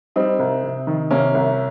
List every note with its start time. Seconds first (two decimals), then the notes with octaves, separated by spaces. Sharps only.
0.16 G3 C4 D#4
0.39 C2
0.63 C3
0.87 D#3
1.11 C3 A#3 C#4
1.34 C2